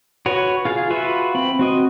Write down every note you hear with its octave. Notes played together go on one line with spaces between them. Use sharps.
F#4 B4 C#5
F4 G#4 F5
F4 F#4 B4 E5
C4 B5
C4 F#4 D#5